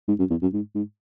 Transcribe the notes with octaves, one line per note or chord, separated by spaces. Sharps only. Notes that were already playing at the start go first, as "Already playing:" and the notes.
G#2
F#2
E2
F#2
G#2
G#2